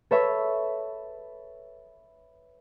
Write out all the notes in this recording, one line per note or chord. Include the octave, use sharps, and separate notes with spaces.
A4 B4 C#5 E5 B5